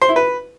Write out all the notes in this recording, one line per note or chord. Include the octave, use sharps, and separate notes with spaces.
C5
E4
B4